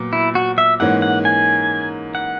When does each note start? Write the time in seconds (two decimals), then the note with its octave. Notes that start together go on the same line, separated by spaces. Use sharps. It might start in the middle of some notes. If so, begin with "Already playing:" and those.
Already playing: A#2 F#3 B3
0.13 E4
0.35 F#4
0.58 E5
0.80 G#2 E3 A#3 C#4 F#5
1.02 F#5
1.25 G#5
2.15 F#5